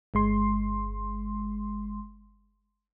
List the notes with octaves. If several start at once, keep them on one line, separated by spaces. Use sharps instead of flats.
G1 G#3 C6